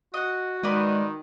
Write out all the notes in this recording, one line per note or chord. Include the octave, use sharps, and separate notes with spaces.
F#4 D#5 F#5
D#3 G#3 B4 D5 D#5